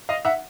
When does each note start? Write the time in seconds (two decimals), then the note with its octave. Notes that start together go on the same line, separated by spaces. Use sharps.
0.09 D#5 F5
0.25 E5 F#5